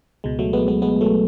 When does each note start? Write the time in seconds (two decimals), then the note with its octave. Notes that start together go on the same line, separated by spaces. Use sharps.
0.24 C#2 B2 G#3
0.39 F#3 A3
0.53 G#3 B3
0.68 G#3 B3
0.82 G#3 B3
1.01 F#3 A3